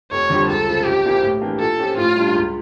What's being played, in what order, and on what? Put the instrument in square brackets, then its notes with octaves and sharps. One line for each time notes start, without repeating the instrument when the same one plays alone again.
[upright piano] F1 [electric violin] C#5
[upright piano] F2 D3 G3
[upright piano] C#2 [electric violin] A4
[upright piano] C#3 F3
[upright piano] A#1 [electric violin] G4
[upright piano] A#2 F3 A#3 E4
A2
E3 A#3 D4 G4
[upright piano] A#2 [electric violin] A4
[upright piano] F3 C#4 G4
[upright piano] A2 [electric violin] F4
[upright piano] G3 D4
C#2